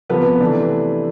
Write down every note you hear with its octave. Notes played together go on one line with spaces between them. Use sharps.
C3 F3 B3 B4
C3 E3 A3 D4